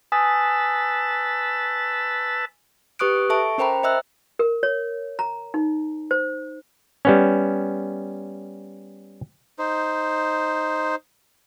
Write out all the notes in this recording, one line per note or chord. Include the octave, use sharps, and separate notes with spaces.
B4 G#5 A5 D#6 E6
G4 B4 C#6 D#6 F#6 D7
A4 E5 A5 C#6 D7
C#4 A#4 C5 G5 A#5 B5
C5 D#5 E5 E6 F#6
A#4
C#5
A#5
D#4
C5
G3 B3 C#4
D#4 C5